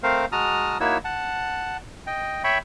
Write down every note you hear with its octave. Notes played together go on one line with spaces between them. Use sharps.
A3 C4 A#4 C5 F5
G#3 F#4 A5 A#5 D#6 F6
A#3 D#4 E4 F#4 C#5 E6
F#5 A5
D#5 G5
C#5 E5 G5 B5 C#6